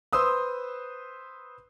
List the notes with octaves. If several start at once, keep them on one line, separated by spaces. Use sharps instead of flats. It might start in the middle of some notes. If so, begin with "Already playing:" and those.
B4 C5 C6 D#6 E6